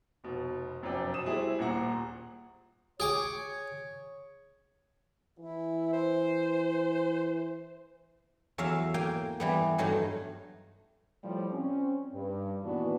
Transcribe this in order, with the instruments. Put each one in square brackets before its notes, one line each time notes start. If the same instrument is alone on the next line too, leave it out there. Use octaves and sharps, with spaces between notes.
[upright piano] F1 B2
F1 F#2 F3 D5 G5
B2 D#6 E7
C3 G3 C4 E4 G#4
D#1 A#2 A#3 F#5 A#5
[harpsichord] G#4 G5 D6 [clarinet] C#5
[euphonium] E3 [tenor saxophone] E4
[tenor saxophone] C5
[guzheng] E2 F#3 E5 F5
A#3 G5 G#5
E3 G3 B3
G2 F#3 A3 D#4
[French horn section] A2 F3 G3
C4 C#4
G2
D#2 A#2 E3 B3 D4 F#4